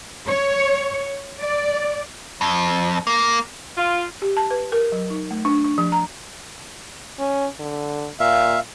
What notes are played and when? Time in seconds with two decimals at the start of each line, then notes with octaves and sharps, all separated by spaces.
0.27 C#5
1.41 D5
2.41 F2
3.07 A#3
3.77 F4
4.22 G4
4.37 A5
4.51 B4
4.72 A#4
4.92 F#3
5.10 D#4
5.31 A3
5.45 D4
5.64 D4
5.78 F3
5.92 A#5
7.19 C#4
7.60 D3
8.20 A#2 E5 F5